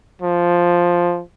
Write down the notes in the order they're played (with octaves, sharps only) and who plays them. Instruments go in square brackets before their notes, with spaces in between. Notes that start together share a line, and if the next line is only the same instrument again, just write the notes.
[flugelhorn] F3